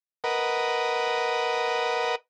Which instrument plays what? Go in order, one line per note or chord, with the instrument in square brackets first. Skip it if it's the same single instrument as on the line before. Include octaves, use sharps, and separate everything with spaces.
[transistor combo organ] A#4 B4 D#5 F#5